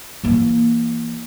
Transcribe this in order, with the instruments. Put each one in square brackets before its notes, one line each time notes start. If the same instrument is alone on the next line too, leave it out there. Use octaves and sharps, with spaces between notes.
[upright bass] E3 A#3